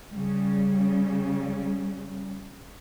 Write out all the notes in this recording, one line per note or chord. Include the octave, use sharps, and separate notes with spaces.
C#3 G3